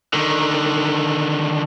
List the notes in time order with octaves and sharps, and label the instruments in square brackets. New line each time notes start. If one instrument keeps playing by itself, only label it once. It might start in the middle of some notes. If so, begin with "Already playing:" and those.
[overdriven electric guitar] D3 D#3